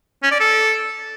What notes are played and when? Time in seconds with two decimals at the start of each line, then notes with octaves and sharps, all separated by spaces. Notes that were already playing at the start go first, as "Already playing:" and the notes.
0.23 C#4
0.31 D5
0.40 A4